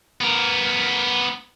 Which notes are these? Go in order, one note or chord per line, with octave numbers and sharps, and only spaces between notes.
B3 A#4